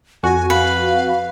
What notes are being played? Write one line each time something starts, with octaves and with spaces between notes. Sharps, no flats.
F2 F#4 G#5
B4 F5